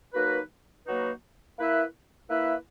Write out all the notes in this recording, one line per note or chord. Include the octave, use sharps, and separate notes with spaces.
F#3 A#3 D#4 F#4 B4
F#3 A#3 D#4 F#4 B4
A#3 E4 B4 E5
A#3 E4 B4 E5